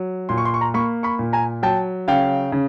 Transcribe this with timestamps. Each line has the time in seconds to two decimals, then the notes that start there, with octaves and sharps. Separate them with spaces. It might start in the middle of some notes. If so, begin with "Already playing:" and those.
Already playing: F#3
0.29 A#2 C6
0.38 C#6
0.45 C6
0.54 C#6
0.61 A#5 C6
0.74 A#3 B5 C#6
1.03 B5 C#6
1.19 A#2
1.33 G#5 A#5
1.63 F#3 G5 A5
2.08 C#3 F5 G5
2.52 C#3